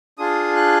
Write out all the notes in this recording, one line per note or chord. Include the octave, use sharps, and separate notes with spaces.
D4 F4 G#4 D#6
F#6